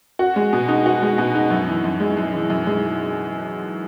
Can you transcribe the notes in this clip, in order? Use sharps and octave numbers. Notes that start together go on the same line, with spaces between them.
F#4
G#3
B2
D#4
F#4
G#3
B2
D#4
F#2
E3
F#2
G#3
F#2
E3
F#2
G#3